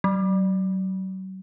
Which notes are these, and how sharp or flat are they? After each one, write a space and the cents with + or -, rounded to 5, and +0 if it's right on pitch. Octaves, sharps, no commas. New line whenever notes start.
F#3 +35